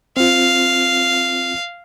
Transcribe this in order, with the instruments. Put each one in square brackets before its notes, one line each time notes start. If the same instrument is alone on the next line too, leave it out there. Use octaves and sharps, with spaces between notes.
[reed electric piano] C4 F4 [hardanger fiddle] F5